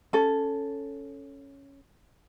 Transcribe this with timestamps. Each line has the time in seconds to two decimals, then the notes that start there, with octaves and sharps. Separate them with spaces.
0.13 C#4 A4